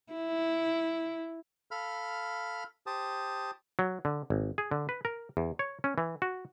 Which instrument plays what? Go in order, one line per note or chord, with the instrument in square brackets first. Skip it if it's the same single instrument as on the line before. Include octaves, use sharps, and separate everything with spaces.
[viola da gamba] E4
[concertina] A4 F5 B5 F6
G4 C5 A5 D#6
[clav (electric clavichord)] F#3
D3
G#1
G#4
D3
B4
A#4
E2
C#5
C#4
E3
F#4